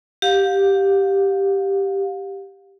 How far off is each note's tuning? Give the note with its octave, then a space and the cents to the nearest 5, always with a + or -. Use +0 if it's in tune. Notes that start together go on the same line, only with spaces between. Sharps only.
G4 +0 F5 +35